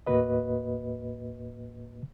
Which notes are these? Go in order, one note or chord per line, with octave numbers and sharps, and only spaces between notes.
D#2 A2 A#3 F#4 B4 D#5